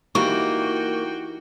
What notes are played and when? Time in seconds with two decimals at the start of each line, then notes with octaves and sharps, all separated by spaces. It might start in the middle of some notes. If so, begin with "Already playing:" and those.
0.15 E3 G3 A#3 D#4 F#4 G5 C#6